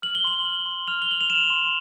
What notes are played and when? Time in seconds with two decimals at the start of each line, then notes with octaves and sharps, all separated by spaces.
0.02 F6 F#7
0.15 G7
0.24 C6 F#7
0.45 F6
0.66 C6
0.87 F6 F7
1.02 G7
1.09 C6 F#7
1.21 F7
1.30 F6 E7
1.50 C6